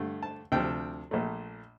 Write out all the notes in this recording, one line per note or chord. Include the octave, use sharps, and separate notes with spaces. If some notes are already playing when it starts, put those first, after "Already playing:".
Already playing: G2 D3 A3
A5
D2 C3 F3 G5
A#1 A#2 A3